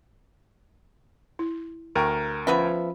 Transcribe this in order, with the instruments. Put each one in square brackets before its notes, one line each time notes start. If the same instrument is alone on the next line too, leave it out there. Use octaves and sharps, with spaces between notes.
[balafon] E4
[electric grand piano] D2 A#4 [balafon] G5 C#6
[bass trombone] F3 [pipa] B3 B4 E5 [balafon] C#4